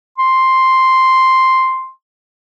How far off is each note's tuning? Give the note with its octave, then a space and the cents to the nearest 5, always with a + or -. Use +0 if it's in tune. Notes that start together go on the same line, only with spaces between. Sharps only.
C6 +0